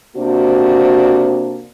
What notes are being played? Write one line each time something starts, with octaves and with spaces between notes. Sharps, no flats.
C3 A#3 C4 D4 F#4